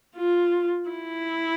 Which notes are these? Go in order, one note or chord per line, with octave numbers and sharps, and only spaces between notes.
F4
E4